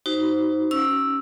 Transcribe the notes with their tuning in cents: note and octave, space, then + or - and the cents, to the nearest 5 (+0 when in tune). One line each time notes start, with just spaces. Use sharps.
D#4 +15 F#4 +25 C5 -5
C#4 +0 E6 +0